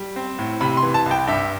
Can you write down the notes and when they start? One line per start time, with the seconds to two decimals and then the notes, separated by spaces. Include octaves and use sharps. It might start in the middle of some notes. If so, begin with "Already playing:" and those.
Already playing: G3
0.16 C4
0.39 A2
0.61 C3 B5
0.77 C6
0.83 E3
0.94 A5
1.06 C2
1.11 G5
1.27 G2 E5